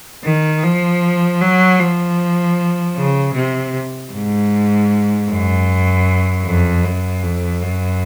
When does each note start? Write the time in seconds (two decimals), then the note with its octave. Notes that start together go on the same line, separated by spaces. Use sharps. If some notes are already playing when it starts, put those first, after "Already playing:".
0.24 D#3
0.63 F3
1.41 F#3
1.80 F3
2.96 C#3
3.35 C3
4.12 G#2
5.29 F#2
6.46 F2
6.84 F#2
7.23 F2
7.62 F#2